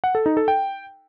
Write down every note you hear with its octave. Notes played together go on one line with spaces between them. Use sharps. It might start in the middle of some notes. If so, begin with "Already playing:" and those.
F#5
A4
D#4
A4
G5